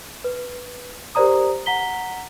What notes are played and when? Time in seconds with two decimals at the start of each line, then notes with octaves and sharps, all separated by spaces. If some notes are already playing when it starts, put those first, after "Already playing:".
0.24 B4
1.15 G4 A#4 C5 D5 A#5 D#6
1.66 F#5 A#5 B6 G7